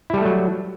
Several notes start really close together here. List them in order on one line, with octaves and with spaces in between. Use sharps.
E4 G3 A4 A3 F#3